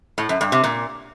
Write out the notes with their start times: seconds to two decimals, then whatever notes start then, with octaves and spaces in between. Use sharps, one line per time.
0.18 A2
0.29 F#2
0.41 G2
0.52 C3
0.64 A#2